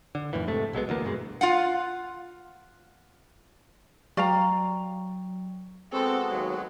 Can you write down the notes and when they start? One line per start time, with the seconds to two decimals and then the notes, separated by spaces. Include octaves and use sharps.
0.15 D3
0.33 F2 A2 D#3 E3
0.47 G#2 C3 A3
0.73 B1 F#3 G#3 B3
0.89 D2 E3 A#3 B3
1.04 D2 G2 B2 G#3
1.41 F4 F5 F#5
4.17 F#3 D5 F5 G5 A#5 C#6
5.93 G#3 B3 C4 F#4 A4
6.31 D#2 F#3